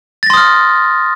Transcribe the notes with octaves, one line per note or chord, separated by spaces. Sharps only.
C6 D#6 F6 A6 A#6